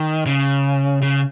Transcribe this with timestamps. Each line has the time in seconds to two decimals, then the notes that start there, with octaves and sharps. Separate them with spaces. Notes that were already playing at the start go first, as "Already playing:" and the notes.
Already playing: D#3
0.26 C#3
1.02 C#3